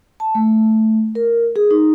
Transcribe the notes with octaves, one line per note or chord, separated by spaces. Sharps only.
A5
A3
A#4
G#4
D#4